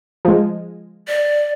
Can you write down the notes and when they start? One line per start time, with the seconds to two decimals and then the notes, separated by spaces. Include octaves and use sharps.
0.25 F3 G#3
1.08 D5